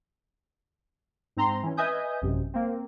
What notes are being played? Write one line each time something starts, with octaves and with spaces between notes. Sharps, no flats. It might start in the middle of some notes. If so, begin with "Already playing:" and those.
G#2 C4 A#5 C6
E3 C#4
B4 D#5 E5 G#5 D#6 G6
A1 F#2 C3
A#3 C4